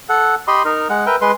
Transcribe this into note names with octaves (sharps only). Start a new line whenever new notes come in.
A4 F#5
G4 D#5 B5 C6
D#4 A#4
G#3 F#5
A#4 B4 E5 G5
G#3 B4 C6